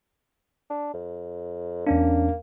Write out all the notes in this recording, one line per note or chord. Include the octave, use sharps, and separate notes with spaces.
D4
F2
E2 A#3 C#4 D4